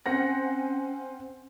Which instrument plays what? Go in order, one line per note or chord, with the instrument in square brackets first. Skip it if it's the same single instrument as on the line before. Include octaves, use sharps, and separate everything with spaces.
[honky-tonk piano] C4 F#5 A#6 [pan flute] C#4